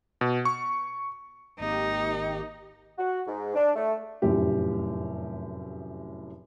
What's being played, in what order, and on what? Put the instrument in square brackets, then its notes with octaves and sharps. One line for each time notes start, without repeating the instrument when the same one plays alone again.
[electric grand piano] B2
C#6
[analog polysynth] G#1 A#3 G4 [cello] D#4
[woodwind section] F#4
G#2
D4
A3
[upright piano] F1 F#2 A2 G4